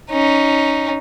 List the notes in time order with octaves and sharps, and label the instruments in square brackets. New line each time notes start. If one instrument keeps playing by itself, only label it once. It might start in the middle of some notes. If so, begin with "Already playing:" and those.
[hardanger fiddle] C#4 D#4